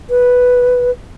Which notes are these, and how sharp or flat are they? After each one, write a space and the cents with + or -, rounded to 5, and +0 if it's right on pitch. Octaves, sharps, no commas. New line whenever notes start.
B4 +0